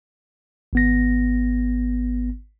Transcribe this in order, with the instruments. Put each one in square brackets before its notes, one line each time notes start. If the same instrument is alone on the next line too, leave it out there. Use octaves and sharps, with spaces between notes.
[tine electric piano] G#1 B3 A#6